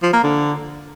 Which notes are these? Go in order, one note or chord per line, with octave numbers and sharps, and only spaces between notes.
F3
A#3
D3